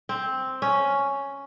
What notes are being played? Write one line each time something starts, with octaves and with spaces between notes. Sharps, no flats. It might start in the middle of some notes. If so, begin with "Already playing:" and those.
C4
C#4